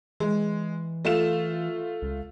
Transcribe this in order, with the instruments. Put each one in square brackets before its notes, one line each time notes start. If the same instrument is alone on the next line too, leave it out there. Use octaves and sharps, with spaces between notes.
[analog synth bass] E3 [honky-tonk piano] G#3
[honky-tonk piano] A3 F4 E7
[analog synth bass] C#2